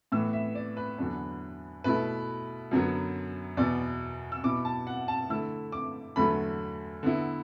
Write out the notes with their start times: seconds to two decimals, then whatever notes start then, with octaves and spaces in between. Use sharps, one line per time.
0.12 A2 E3 B3 E6
0.33 E5
0.55 D5
0.77 B4
0.98 E2 D3 F#3 B3 D4
1.84 B2 A3 E4 B4
2.71 F#2 D3 F#3 B3
3.57 E2 B2 B3 D5
4.32 E6
4.43 B2 B3 E4 D6
4.65 A5
4.87 F#5
5.08 A5
5.30 D3 A3 E4 E6
5.72 D6
6.16 E2 D3 F#3 A3 B5
7.03 D3 B3 E4